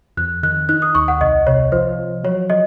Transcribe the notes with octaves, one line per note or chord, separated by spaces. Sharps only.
F2 F#6
D#3 F#6
D#4 F#6
D#6
D#2 C#6
F#5
C2 D#5
C3 C#5
F3 C5
F3
F#3 C#5
F#3 D#5